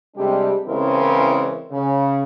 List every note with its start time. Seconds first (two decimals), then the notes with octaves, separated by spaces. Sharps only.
0.16 C3 G3 G#3 D4 G4
0.67 C#3 E3 G#3 C4 E4 A#4
1.71 C#3